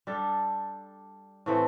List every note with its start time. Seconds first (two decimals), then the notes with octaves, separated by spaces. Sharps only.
0.07 G3 D4 A4
1.46 A2 E3 A3 C4